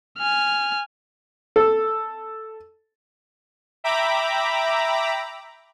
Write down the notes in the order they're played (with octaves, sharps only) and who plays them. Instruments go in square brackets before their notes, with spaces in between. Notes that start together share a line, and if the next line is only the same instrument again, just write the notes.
[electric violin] G#5 F6
[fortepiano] A4
[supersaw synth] E5 G5 A#5 B5 D6